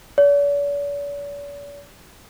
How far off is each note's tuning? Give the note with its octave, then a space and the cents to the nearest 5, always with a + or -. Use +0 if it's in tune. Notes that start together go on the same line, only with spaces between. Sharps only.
D5 -45